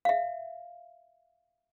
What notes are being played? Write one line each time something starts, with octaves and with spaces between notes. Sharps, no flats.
E5 F5